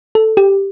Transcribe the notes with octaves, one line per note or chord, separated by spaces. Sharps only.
A4
G4